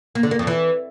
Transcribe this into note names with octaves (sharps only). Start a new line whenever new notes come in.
A#3
D3
A#3
F2
E3